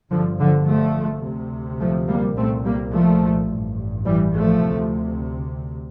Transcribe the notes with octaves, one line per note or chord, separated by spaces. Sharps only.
G1 G2 D3 F3
D3 F3
F3 A3
D2 C3
F3 A3
G3 A#3
C2 A#2 A3 C4
G3 A#3
F3 A3
A1 G2
E3 G3
F3 A3
D2 C3